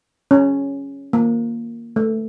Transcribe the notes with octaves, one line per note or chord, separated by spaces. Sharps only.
C#4
A#3
A3